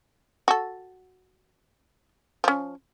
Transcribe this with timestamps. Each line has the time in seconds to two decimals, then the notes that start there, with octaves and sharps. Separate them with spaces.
0.48 F#4 A4
2.44 F3 C#4